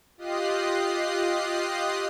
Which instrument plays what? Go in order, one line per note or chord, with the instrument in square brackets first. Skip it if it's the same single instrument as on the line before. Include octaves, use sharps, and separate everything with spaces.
[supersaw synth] F4 G4 D#5 D#6 F#6 C7